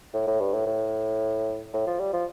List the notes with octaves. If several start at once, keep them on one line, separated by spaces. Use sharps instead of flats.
A2
A2
G2
A2
A2
A2
F3
G3
F3